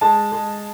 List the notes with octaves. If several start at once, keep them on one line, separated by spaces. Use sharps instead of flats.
G#3 A5
G#3